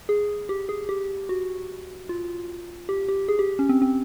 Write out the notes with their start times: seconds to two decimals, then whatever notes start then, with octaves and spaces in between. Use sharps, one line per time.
0.09 G#4
0.49 G4
0.69 G#4
0.89 G4
1.29 F#4
2.09 F4
2.89 G4
3.09 G4
3.28 G#4
3.39 G4
3.59 C#4
3.69 C4
3.82 C4